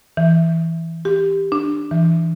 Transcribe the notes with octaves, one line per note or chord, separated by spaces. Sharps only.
E3
G4
D4
E3